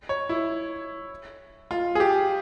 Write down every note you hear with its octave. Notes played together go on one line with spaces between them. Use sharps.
C#5
E4
F4
G#4
G4